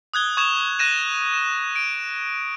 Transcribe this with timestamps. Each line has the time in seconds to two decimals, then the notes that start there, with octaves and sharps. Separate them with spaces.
0.14 D#6 F#6 G#6 G7
0.37 C#6 D#6 G#6 E7 F7
0.79 F#6 G#6 A#6 D#7 E7
1.34 E7
1.76 D7